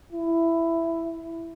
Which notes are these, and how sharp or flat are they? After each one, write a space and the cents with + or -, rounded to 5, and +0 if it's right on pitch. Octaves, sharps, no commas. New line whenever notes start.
E4 +10